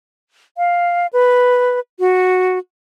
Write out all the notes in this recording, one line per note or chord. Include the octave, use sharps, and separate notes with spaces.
F5
B4
F#4